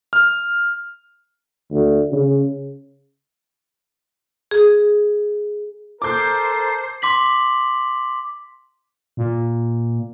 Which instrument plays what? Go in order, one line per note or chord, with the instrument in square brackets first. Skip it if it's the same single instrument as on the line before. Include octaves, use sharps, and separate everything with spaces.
[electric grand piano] F6
[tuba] D2
C#3
[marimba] G#4
[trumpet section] A4 A#4 [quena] C5 [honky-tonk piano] D6 G6
[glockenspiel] C6 D6 B6 F#7
[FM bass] A#2